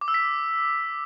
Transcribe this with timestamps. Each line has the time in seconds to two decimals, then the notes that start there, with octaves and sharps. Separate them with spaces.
0.01 D6
0.08 E6
0.14 B6